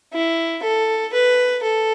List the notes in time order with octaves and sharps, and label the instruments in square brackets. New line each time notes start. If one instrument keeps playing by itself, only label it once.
[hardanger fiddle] E4
A4
B4
A4